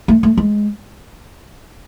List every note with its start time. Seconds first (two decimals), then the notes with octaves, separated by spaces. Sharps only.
0.08 A3
0.23 A3
0.37 G#3